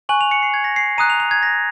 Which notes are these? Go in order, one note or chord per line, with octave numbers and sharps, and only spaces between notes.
G#5 C#6 F#6 F#7
F7
C#7
C7
G#6
A#6
C7
A#5 D#6 F#6 D#7
F7
F7
G#6
A#6